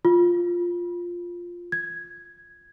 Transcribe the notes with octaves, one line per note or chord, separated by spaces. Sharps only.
F4
G#6